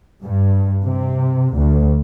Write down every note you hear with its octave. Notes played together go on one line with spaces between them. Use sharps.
G2
C3
D2